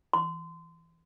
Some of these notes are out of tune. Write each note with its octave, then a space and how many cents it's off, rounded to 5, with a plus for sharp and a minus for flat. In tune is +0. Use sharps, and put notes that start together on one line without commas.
C6 -25